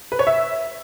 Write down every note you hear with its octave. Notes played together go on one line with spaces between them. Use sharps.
B4
C#5
E5